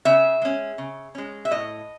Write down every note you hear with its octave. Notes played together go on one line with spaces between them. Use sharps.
C#3 E5
G#3 C#4
C#3
G#3 C#4
E5
A2 D#5